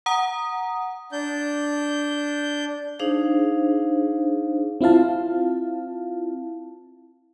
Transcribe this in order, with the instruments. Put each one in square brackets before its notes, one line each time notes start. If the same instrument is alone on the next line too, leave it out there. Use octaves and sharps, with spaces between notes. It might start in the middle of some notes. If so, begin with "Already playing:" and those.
[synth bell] F#5 A#5 D#6
[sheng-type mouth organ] D4 G6
[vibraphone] D4 D#4 G#4 C5 F5
[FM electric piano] C4 E4 F4 F5 A5